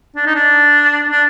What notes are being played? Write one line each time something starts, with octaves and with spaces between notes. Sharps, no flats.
D4
D#4
D4
D4